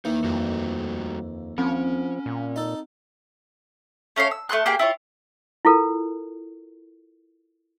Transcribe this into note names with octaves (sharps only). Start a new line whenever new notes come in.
D#2 E3 D#4 A#4
F2 G3 A3 F#4
F3 C4 C#4
A#2
D#4 A4
A3 C#4 C#5 F5
E6
A3 G#4 C6 F#6
A#3 G4 G#4 G5
E4 F4 C#5
E4 F4 A4 A#4